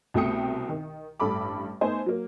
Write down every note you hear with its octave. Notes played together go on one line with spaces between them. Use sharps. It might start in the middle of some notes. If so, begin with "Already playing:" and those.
C2 B2 A3 G5 D#6 C#7
D#3
A1 G2 A4 B5 D6
A3 B3 D#4 C5 G#5
F#3 A#3